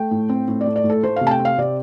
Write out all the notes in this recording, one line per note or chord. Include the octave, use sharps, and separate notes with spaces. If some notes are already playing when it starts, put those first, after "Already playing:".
Already playing: A3 G5
A2
C4
A2
D5
A3
D5
A2
A4
A3 C5
C3 F5
A5
G5
C4
F5
C3 D5